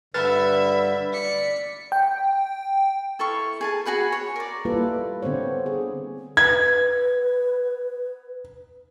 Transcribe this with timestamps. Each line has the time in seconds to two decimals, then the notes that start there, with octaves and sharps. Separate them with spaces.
0.14 G2 D3 B4 E5 B5 F6 A6
1.12 D5 B6 C#7
1.92 G5
3.19 E4 A4 F5 C#6
3.61 G#4 G#5 A5
3.86 F#4 G#4 F#5 B5
4.12 C#5
4.36 A#4 D5
4.65 G3 A#3 E4 F4 A4 B4
5.22 D3 B3 C4 C5 C#5
5.66 G#4
6.37 B4 G#6